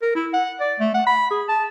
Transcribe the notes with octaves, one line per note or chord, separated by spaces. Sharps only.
A#4
E4
F#5
D5
A3
F#5
B5
G#4
A5